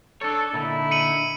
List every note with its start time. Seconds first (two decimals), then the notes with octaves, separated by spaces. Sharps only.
0.21 D4 A4 C#5
0.53 A#2 D3 D#4 E4
0.91 C#7 D#7 F#7